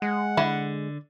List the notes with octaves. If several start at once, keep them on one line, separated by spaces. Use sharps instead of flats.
G#3 F#5
D3 E4